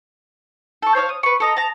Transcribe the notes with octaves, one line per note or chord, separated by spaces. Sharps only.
A4 C#6
C5 C#5 D#5 F5
D#6
B4 C#6
A4 D#5 A#5
A5 A#5